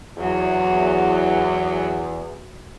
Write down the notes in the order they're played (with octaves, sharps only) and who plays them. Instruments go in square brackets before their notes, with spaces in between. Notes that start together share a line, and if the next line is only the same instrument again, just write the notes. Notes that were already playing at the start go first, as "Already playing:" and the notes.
[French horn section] E2 [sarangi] F#3